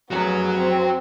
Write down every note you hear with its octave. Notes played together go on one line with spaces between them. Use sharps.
F1 F#2 B3 F#4 G#4 C#5
C4